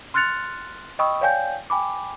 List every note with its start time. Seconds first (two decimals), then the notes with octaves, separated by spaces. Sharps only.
0.14 C6 F6 F#6 A6 C#7 F7
0.99 D#5 G5 B5 C#6 D#6 E6
1.21 C#5 D5 F5 G5 G#5 G6
1.70 G5 G#5 B5 D6